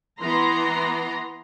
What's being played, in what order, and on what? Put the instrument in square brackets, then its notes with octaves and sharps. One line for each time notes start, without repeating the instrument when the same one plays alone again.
[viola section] E3 B3 A#5 C6